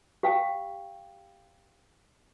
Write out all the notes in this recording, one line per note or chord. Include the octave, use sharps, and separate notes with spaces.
G4 F5 G5